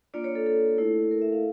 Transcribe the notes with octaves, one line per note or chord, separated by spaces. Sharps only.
A#3 D4 F4 D5
C#5
A4
A4
A3 E4
A#4
E5
F5